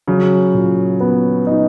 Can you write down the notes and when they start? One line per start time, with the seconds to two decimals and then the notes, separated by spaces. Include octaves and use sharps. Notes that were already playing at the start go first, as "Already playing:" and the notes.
0.08 C#3 F#3
0.54 A#2
1.00 B3
1.47 D#4